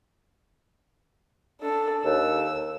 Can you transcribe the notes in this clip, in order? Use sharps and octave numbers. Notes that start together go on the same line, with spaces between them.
D4 A4
D#2 E6